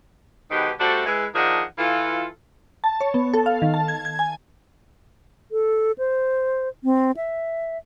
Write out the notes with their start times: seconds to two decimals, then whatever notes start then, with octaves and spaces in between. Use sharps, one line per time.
0.51 G#2 B2 D#3 G4 B4
0.80 G3 A3 D4 F#4 A4 C5
1.06 G#3 E4 B4
1.35 D#3 F3 D4 G#4 D#5 F#5
1.79 E3 F4 A4
2.84 A5
3.01 C#5
3.14 B3
3.34 A4
3.46 F5
3.62 D#3
3.74 A5
3.88 G#6
4.05 G#6
4.19 G#5
5.52 A4
5.98 C5
6.84 C4
7.17 E5